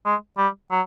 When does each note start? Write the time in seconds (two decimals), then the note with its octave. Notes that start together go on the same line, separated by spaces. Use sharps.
0.05 G#3
0.37 G3
0.71 F#3